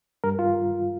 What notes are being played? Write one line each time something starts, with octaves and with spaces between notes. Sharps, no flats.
G2 A#4
F4